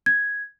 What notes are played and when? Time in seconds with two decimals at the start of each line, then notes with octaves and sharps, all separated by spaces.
0.06 G#6